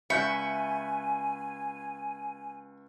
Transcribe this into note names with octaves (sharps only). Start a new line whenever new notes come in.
C#2 E5 G#5 B5 C#6 F#6 G6 C#7